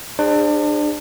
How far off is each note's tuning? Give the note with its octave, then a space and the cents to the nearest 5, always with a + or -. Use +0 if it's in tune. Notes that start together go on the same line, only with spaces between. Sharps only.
D4 +30 G#4 -30 C5 +10